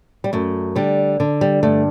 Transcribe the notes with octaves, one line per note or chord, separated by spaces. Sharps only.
G3
F#2 A3
D3 G3
D3
G3
G2 A3